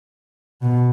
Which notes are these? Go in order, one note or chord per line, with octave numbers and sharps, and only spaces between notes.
B2